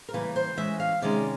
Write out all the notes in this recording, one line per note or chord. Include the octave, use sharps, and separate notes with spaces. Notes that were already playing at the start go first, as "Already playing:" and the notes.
A#4
C#3 E3 G3 A#3 B4
C5
E3 G#3 C#4 E5
F5
C3 D#3 G#3 C#4 D5